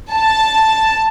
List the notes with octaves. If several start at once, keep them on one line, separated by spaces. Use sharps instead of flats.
A5